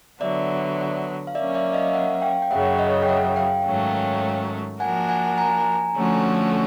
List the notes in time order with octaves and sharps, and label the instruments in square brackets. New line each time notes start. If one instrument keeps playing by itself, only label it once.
[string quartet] D3 F#3 B3 [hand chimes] D5 E5
[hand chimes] F5
[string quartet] F#3 A#3 C#4 [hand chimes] D5 E5
[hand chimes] D5 E5
D#5 F5
E5 F#5
F5 G5
G5
[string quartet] F#2 C#3 F#3 [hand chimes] E5 F#5
[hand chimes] C#5 D#5
G5
E5 F#5
F5 G5
[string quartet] G#2 D#3 F#3 A3 C#4
[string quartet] F3 A#3 D4 F#4 A#4 [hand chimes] F#5 G#5
[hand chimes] F#5 G#5
G#5 A#5
[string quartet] D3 F3 A3 C#4 F#4